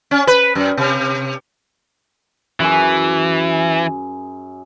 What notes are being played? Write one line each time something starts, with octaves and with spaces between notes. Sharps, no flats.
C#4
B4
F#2
C3
F#2 E3 G#4